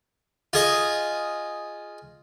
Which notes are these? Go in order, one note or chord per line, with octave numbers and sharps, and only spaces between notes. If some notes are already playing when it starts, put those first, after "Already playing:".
F4 G#4 D#5